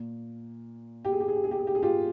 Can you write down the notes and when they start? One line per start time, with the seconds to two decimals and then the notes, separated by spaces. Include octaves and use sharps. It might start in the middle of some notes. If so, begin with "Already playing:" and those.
Already playing: A#2
1.05 G4
1.12 G#4
1.20 G4
1.28 G#4
1.36 G4
1.44 G#4
1.51 G4
1.59 G#4
1.67 G4
1.75 G#4
1.83 F4 G4